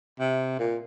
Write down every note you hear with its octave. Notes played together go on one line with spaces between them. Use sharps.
C3
A#2